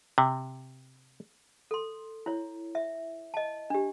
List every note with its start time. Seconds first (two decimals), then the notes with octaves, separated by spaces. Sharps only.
0.18 C3
1.71 A4 C6
2.26 E4 C#5
2.75 E5
3.34 D#5 A5
3.70 D4 G4